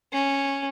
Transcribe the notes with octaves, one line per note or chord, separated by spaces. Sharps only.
C#4